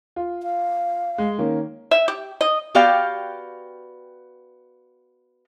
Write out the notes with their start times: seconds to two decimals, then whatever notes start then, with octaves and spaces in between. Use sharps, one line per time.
0.16 F4
0.43 F5
1.18 G#3
1.38 D#3 A#3 C#4
1.91 E5
2.08 G4
2.41 D#5
2.75 B3 F#4 G4 D5 F5 G5